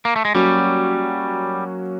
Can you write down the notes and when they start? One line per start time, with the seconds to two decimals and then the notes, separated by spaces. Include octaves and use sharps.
0.05 A#3
0.16 A3
0.25 G#3
0.35 F#3 G3 A#3 C#4 F#4